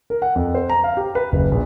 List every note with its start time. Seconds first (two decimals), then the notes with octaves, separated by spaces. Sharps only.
0.10 A#4
0.22 F#5
0.36 F2
0.54 C5
0.69 A#5
0.84 F5
0.97 G4
1.15 B4
1.32 F#1
1.51 A#1